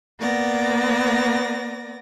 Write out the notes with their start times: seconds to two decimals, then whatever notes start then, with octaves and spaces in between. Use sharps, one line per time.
0.20 A#3 B3 D5 A#6